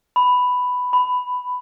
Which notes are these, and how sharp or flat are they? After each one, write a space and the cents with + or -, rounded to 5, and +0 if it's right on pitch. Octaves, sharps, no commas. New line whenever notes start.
B5 +10
B5 +15